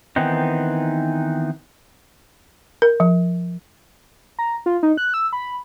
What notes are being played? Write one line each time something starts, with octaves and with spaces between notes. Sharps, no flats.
D#3 E3 B3 C4 D#4
A#4
F3
A#5
F4
D#4
F#6
E6
B5